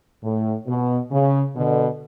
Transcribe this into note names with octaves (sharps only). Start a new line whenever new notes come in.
A2
B2
C#3
B2 D3